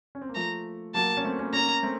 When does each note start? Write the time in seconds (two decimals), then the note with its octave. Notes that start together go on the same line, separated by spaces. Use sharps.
0.15 C#4
0.22 C4
0.29 A#3
0.35 F3 A3 A#5
0.95 F#3 A#3 A5
1.17 C#4
1.24 A3 C4
1.39 A#3 C#4
1.53 A#3 C#4 A#5
1.83 A3 C4